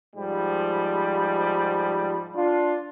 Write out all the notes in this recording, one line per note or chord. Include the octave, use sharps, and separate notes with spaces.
G#2 F3 G3
D4 F4